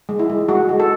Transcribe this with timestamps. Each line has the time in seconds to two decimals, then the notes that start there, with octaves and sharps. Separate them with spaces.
0.09 G#3
0.19 E4
0.30 G#3
0.48 G#3 F#4
0.69 G#3
0.80 A4